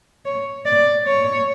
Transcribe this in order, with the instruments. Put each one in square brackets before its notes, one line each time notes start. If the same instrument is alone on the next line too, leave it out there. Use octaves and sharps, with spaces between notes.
[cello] C#5
D5
C#5